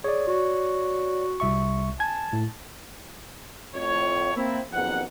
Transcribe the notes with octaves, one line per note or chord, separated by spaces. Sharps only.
G#4 C#5 D5
F#4
C2 E5 C#6
G#5 A5 G#6
A2
F2 A2 C#5
A#3 C4 E4
F#1 F2 D#3 B3 G#4 F#5